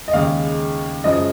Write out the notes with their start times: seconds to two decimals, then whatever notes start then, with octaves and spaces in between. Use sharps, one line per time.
0.08 D#5
0.13 D#2 C#3 G#3 F5
1.04 F#2 C#3 F3 G#3 D#5